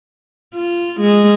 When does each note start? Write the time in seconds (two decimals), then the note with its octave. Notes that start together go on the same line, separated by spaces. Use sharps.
0.55 F4
1.01 G#3